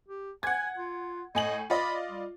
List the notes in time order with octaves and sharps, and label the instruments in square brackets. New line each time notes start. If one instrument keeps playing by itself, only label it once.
[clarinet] G4
[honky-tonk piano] F#5 G#6 [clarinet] G#5
[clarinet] F4
[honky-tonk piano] A2 G#5 F#7 [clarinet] D#5
[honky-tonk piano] F4 D5 D#5 [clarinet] B5
[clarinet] G3